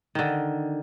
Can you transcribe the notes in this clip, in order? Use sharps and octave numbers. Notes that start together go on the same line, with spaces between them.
D3 D#3